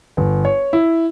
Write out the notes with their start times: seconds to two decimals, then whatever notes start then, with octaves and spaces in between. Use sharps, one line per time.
0.17 G1
0.45 C#5
0.73 E4